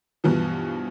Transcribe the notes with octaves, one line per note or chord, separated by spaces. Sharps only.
G2 B2 E3 F3